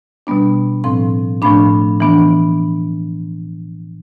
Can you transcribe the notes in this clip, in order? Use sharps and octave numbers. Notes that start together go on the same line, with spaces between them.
B2 G3 B3 D4
A2 F3 C4 C6
A2 F3 A3 D4 B5
E3 B3 D4